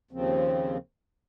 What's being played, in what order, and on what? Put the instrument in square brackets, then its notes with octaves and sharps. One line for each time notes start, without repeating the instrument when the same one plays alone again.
[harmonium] D#2 C#3 F3 C4